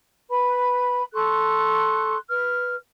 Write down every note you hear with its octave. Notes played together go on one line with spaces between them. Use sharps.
B4 B5
A4 C6 C#6 F#6
B4 F6